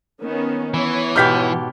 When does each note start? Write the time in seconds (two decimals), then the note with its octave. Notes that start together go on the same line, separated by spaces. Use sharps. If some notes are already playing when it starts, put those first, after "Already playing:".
0.22 D#3 B3 C#4
0.74 E3 B3 C#5
1.16 G#2 B2 G4 F6 G6 B6